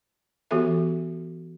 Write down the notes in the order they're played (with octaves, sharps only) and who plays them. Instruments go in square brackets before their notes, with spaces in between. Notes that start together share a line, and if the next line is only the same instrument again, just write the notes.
[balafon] E3 B3 F#4 G4 A4 E5